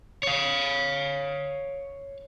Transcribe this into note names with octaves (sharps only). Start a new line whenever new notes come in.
C#5 F5